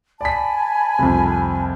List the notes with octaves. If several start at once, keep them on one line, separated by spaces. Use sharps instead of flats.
D5 G#5 A5 B5 B6
C2 F2